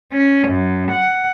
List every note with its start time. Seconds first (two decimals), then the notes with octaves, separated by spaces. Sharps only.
0.13 C#4
0.47 F#2
0.91 F#5